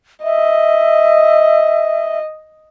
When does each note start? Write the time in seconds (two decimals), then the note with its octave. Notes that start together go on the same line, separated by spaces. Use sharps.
0.24 D#5 E5